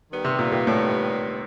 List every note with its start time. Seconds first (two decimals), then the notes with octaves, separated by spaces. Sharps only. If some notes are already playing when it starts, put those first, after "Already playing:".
0.10 D#3 G3 B3
0.25 C3
0.39 A#2
0.52 A#2
0.67 A2